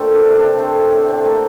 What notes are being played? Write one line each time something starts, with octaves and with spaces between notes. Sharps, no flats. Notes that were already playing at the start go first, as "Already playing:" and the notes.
Already playing: A#2 D3 A3 A4 C5 G5
D4
C3
D4
A3 C4
A2 C4
C4
A3 A#3